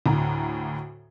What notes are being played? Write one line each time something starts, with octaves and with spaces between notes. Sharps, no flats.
D2 A2 A#5